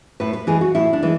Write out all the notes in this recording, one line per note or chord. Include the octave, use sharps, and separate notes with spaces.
A2 B4
B4
E3 G#3 G#4
F#4
A2 E4
D4
E3 G#3